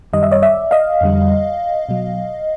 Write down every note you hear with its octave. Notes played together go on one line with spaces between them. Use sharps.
F#2 D#3 G3 D#5
E5
C#5 D#5
D5 E5
D#5 F5
F2 D3 G3
B2 F#3